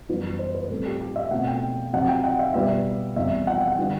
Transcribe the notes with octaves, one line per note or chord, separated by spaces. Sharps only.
F#2 E3 G3 B3
C5
B4
A2 G3 C4 A4
G4
G4
E5
B2 A3 C4 F#5
G5
C3 F#3 C4 F#5
G5
F#5
E5
B2 G3 B3 E5
E2 C3 G3 E5
F#5
G5
F#5
D3 G3 B3 G5